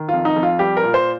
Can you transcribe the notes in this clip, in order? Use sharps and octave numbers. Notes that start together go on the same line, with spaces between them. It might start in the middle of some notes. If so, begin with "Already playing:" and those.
Already playing: D#3
F2 F4
D#4
F2
F4
G3 G4
A#4
A#2
C5